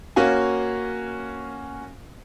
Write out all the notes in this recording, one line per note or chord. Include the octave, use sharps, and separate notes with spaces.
A#3 C#4 F#4 F5 G#5